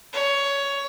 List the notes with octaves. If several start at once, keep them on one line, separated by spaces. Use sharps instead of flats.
C#5